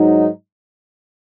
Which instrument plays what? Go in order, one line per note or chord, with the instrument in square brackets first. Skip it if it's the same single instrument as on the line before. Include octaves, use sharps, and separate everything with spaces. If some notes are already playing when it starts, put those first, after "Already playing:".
Already playing: [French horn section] G#2 F#3 D#4